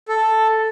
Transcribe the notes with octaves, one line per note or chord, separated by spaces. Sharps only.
A4